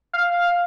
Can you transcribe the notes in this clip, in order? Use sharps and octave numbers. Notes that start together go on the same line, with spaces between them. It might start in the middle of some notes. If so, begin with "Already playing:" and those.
F5